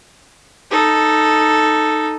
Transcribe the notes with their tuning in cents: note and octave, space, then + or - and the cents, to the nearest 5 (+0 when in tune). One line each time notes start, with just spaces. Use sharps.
D#4 +0 A4 +0